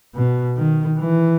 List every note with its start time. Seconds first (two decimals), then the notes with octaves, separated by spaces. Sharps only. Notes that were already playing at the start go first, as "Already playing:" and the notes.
0.15 B2
0.56 D#3
0.99 E3